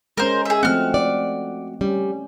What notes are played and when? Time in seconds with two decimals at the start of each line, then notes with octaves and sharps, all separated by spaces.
0.17 G#3 C#4 A#4 C5
0.45 G#4 E5
0.63 F3 A3 C4 F#4 F6
0.94 D5
1.81 G3 C#4